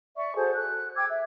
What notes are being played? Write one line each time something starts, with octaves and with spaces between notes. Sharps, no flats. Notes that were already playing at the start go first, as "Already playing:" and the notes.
D5 E5 C#6
F#4 G#4 A4 C5
F#6
G5 D6 E6 G#6
E5